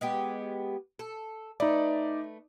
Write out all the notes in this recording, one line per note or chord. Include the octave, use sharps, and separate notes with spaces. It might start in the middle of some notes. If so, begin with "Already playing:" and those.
G#3 B3 G4
A4
A3 D#4 B4 D5